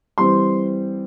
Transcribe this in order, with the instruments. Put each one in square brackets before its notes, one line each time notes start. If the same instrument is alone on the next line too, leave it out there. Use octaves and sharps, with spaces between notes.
[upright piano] E3 G3 C4 C6